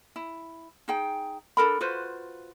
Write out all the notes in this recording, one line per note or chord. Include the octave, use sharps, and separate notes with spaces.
E4
D#4 G#4 G5
D4 A4 A#4 B5
F4 F#4 B4 C5